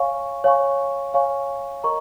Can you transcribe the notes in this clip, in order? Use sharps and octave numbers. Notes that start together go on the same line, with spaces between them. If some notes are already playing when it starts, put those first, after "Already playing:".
Already playing: C#5 F5 G#5 C#6
C#5 F5 G#5 C#6
C#5 F5 G#5 C#6
A#4 D#5 A#5 C#6